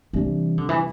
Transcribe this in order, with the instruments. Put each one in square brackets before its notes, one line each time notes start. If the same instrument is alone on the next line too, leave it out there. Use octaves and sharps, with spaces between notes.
[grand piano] C3 G3 D4 [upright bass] E3
[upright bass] D3
E3